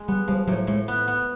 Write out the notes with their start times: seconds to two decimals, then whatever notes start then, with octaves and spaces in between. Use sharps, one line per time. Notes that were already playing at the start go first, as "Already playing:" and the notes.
Already playing: G#3
0.08 G3 B3
0.28 F3 G3
0.47 A2 F#3
0.67 A2 G#3
0.88 B3
1.08 B3